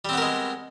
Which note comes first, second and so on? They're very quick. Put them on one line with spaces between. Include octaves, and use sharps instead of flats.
G3 C4 B3 A#4 G#3